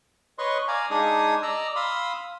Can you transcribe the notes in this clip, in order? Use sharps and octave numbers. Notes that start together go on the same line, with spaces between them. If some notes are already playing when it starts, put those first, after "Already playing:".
B4 C#5 D#5 C6 C#6
D5 F5 G#5 A#5
G#3 D4 D#4 G#4 G#5 D#6
D5 D#5 A#5 E6
F5 B5 C6 D#6 E6